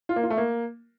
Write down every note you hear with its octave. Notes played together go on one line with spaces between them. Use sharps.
F4
A#3
F4
A3
A#3